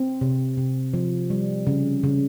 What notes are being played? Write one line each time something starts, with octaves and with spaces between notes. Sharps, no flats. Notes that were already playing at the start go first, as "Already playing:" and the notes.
Already playing: C4
C3
C3
F3
G3
C#3
C#3